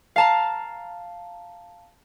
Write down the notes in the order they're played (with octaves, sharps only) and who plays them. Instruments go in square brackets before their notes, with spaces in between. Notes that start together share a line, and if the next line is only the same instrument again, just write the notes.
[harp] F5 A5 A#5